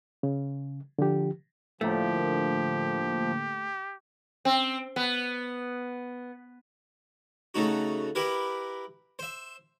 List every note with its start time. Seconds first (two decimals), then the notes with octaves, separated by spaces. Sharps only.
0.23 C#3
0.99 D3 F3 G4
1.81 A2 D3 F3 A3 A#3 G4
4.45 C4
4.96 B3
7.54 C#3 A3 D#4 F#4
8.15 E4 G4 A#4 B4
9.19 C5 E5